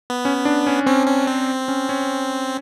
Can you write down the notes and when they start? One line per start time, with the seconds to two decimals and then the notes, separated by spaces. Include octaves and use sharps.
0.10 B3
0.25 C#4
0.45 D4
0.66 C#4
0.86 C4 C#4
1.07 C#4
1.27 C4
1.68 C#4
1.89 C#4